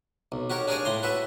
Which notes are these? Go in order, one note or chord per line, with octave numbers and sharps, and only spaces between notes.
B1
F#4 G4 A#4 C#5
D4 G#4 A#4 C#5 F5 G#5
A2 A#5 C6
F#4 A4 B4 E5